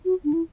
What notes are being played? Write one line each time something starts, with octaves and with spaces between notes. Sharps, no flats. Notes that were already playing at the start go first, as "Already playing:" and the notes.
F#4
D4
E4